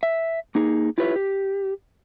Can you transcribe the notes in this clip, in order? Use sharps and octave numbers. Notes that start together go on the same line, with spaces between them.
E5
A#3 D#4 G#4
E4 F4 G4 B4 C#5 E5
G4